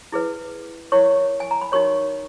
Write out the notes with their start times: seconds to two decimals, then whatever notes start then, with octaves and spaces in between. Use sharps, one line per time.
0.12 E4 G#4 B4
0.92 E4 A#4 C#5 C#6
1.40 G#5
1.51 A#5
1.61 B5
1.72 D#4 F#4 A#4 C#5 C#6